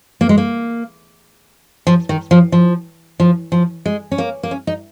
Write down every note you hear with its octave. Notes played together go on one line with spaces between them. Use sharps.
A#3
G#3
A#3
F3
D#3
F3
F3
F3
F3
G#3
C#4
A#3
A#3
C#4
D#4